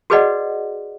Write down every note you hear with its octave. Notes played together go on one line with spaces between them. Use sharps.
F#4 G#4 B4 D5 D#5 F#5